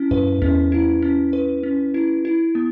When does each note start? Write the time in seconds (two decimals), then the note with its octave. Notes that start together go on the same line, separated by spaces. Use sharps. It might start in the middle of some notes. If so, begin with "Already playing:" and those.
Already playing: C#4 E4
0.11 F#2 B4
0.42 E2 C#4
0.72 E4
1.02 C#4
1.33 B4
1.63 C#4
1.94 E4
2.25 E4
2.55 B3